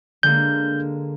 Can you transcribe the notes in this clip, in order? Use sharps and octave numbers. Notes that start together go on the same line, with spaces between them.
D3 G#3 A#3 G6